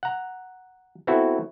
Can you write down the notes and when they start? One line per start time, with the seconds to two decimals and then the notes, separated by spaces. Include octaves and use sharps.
0.03 F#5 A#5
1.07 B3 C4 E4 F#4 A4